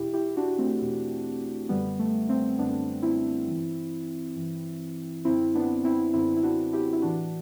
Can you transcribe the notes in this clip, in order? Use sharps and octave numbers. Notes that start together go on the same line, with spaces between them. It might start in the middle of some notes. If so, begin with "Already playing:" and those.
Already playing: E2 B2 E4 G4
E4 G4
D4 F#4
A3 C4
E2 B2
F#2 D3 G3 B3
A3
A3 C4
F#2 D3 B3 D4
C4 E4
G2 E3
G2 E3
F#2 D3 C4 E4
B3 D4
C4 E4
F#2 D3 C4 E4
E4
D4 F#4
E4 G4
E4
A2 E3 D4 F#4